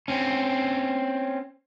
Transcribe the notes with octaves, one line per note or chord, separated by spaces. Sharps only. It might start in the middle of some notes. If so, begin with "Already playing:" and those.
C4 C#4